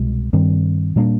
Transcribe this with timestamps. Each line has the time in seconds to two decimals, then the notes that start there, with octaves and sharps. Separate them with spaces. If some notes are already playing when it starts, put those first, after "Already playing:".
Already playing: C2 B2 G#3
0.33 G2 D#3 G3 C4
0.96 A#2 G3 A#3 D4